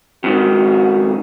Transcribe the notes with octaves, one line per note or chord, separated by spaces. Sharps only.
F2 G#2 D#3 F#4